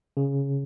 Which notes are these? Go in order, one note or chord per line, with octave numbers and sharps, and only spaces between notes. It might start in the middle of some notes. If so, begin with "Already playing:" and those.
C#3